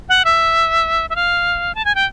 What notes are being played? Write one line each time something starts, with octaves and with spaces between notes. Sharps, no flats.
F#5
E5
E5
F5
A5
G#5
G5